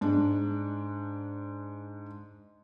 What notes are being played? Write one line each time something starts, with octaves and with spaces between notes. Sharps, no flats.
G#2 D4